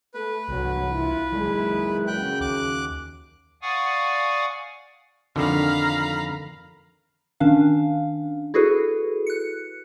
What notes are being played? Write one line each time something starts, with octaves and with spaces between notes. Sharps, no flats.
A3 A4 B4
C2 F#3 A#3
E4 F4
D#3 F#3 G#3 A#3 E4 G#4
F#2 C#3 G5 F#6
D#2 D6 F#6
D5 F5 F#5 G#5 C#6 D#6
F2 D3 D#3 F5 A#5 B5
D#3 C#4 D4 F5
E4 F#4 G#4 A4 B4
F#6 C#7